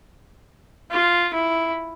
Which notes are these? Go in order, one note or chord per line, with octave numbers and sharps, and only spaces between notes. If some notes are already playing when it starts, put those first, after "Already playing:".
F4
E4